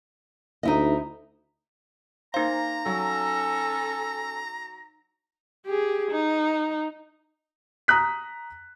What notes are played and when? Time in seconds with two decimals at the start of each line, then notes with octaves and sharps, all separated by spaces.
0.63 D2 D#4 E4 D#5
2.34 A#3 D#4 C5 F5 A#5
2.86 F#3 C#4 A4
5.66 G4 G#4
6.11 D#4
7.88 A#5 D#6 F#6 B6